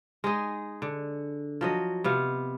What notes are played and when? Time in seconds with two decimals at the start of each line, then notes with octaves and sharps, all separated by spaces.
0.24 G#3 D#4 G#4
0.82 D3
1.61 F3 F#3 D#5
2.04 C3 B3 F5